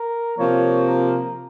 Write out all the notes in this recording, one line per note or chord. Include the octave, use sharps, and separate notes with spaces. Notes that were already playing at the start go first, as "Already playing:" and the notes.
Already playing: A#4
C3 F3 A#3 C#5
A#4